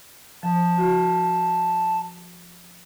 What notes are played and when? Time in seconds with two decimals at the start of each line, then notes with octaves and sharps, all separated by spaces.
0.43 F3 A5
0.78 F#4